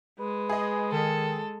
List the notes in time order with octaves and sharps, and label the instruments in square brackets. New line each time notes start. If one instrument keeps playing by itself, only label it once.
[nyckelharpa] G#3 [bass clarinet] B4
[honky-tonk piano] G#4 D#5
[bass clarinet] D#3 [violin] A4